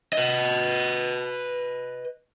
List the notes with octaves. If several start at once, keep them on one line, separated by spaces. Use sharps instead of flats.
B4 D#5